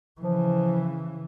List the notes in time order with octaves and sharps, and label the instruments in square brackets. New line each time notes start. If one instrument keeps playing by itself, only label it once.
[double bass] C#3 E3 [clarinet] F3